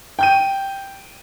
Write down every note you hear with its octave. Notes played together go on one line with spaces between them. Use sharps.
G5 G6 D#7